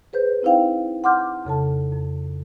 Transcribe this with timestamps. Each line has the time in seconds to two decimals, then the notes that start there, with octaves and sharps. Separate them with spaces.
0.13 G#4 B4 C5 G6
0.43 C4 D#4 E4 C5 F5 G5
1.04 F#5 C6 D6 F6 G6
1.45 F2 C#3 A4 A5
1.92 F2